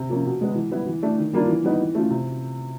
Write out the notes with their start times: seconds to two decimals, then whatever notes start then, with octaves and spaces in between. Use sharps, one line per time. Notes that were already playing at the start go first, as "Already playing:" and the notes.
Already playing: C3
0.09 F3 A#3 C#4 F4
0.26 B2
0.41 G#3 B3
0.55 E3
0.72 G3 B3 E4
0.87 E3
1.02 A3 D4
1.18 D#3
1.33 G3 A#3 D4 F4
1.48 E3
1.64 G3 B3 D#4
1.80 E3
1.95 A3 C#4 F4
2.10 C3